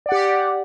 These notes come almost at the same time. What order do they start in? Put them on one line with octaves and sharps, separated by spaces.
D5 F#5 G4